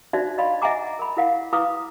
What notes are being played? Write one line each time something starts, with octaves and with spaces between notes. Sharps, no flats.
D4 D#4 F#4 C5 D5 E5
D5 D#5 F5 B5 C6
D#5 E5 F#5 G#5 A#5 D6
A#4 B5
E4 A#4 F5 F#5
E4 B4 F5 A#5 D6 D#6